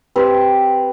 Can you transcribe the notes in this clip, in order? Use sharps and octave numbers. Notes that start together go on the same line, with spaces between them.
C4 G4 B4